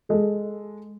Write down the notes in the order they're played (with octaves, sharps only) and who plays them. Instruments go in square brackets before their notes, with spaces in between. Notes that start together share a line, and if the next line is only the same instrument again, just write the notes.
[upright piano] G#3 A4